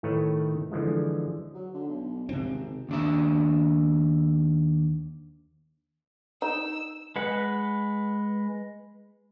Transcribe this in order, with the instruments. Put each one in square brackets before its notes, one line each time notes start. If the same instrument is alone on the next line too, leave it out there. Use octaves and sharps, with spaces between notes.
[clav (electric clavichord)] A2 D#3 A3 B4 C#5
D3 E3 F3 G#3
[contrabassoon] F#3
D3
B1
[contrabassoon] G#1 [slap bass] C3 C4
[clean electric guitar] D#2 D4 E5
[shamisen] D#4 [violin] E6
[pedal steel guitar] G#3 B4 F#5